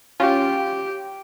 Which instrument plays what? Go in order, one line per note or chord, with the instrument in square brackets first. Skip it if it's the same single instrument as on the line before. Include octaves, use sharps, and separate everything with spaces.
[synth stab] C#4 F4 [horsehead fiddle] G4